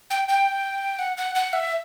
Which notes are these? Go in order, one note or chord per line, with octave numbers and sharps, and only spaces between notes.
G5
G5
F#5
F#5
F#5
E5